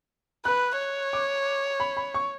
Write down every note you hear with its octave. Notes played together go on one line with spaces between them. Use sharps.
B4 F#6
C#5
D6
B5
B5
C#6